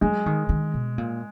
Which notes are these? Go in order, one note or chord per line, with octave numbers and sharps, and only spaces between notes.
F#3 G#3
D#3
D#3
B2
A#2